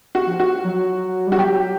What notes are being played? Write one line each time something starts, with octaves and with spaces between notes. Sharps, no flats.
F#4
F3
F#4
F#3
G3 F#4
F#3 G4